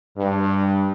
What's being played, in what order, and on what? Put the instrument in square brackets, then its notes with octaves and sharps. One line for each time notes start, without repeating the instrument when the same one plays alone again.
[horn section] G2